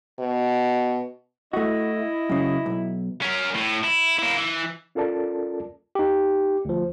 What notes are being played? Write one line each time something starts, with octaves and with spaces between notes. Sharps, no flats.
B2
A3 E4 F#4 D#5
F#2 C#3
B1
C#4 A#4
A2
E4
A#3 E4
E3
C#4 F4 A4 A#4 D5 A5
D#4 G4
D2 F3